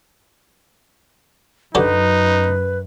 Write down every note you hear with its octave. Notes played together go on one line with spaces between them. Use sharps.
F#2 D3 F#3 D#4 G4 B4